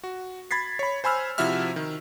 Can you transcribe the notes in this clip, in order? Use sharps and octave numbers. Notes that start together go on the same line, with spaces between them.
F#4
B5 G#6 A6 B6 C7
C#5 B5
C5 G#5 B5 E6 F6
C3 F3 E4 F#4 E5 F6
D#3